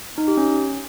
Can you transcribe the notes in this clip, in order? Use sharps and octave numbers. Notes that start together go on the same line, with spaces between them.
D#4
G4
C#4